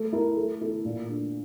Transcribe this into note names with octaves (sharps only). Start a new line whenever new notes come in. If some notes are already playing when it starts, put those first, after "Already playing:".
Already playing: A3
E4 A#4
A3
E4 A4
A#2
A3 D4